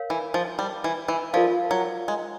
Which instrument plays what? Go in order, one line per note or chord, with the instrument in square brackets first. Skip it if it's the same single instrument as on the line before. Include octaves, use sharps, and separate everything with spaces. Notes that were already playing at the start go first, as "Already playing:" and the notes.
Already playing: [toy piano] A#4 C#5 F5
[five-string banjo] E3
F3
G3
E3
E3
[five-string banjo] F3 [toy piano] F4 A#4 D5 F5
[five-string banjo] F#3
G#3